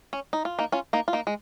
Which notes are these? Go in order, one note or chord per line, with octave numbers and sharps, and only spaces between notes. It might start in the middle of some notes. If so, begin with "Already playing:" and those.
C#4
D#4
F4
A#3 D#4
C#4 F4
A#3 D#4
F4
A#3 D#4
G#3